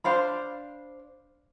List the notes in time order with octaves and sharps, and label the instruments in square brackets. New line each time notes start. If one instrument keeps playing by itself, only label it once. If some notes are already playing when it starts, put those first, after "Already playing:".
[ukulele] D4 C5 F5 B5